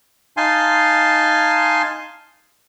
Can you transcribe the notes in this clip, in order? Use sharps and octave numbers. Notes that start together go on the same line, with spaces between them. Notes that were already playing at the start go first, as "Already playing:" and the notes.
D#4 F5 G#5 A5 C6